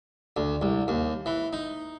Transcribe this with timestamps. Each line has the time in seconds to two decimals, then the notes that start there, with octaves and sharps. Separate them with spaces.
0.37 D2
0.62 C2
0.88 D#2
1.26 E3
1.53 D#4